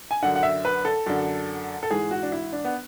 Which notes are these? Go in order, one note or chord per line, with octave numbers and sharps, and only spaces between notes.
G#5
F#2 D3 F#5
F#5
E5
B4
A4
F#2 D3
A4
G#2 E3 G#4
F#4
D4
E4
D4
B3